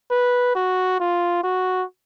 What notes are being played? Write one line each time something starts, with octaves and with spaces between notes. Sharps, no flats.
B4
F#4
F4
F#4